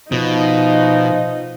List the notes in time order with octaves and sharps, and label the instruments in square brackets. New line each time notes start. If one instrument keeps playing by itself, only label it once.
[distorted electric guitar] B2 [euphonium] F3 [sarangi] D#4